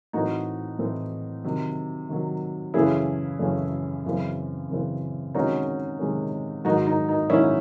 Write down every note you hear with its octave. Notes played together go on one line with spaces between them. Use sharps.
A2 E3 C4 D#4 F#4
A2 E3 C4
C3 D#3 F#3
C3 D#3 F#3
F#2 C#3 E3 A3 C#4 E4 G#4
F#2 C#3 E3 A3 C#4
F#2 C#3 E3 C4
F#2 C#3 E3 C4
C3 D#3 G#3 C#4 D#4 F#4
C3 D#3 G#3 C#4
G#2 D#3 F#3 D#4 F#4
D#4
D#4
G#2 D#3 F#3 C#4 E4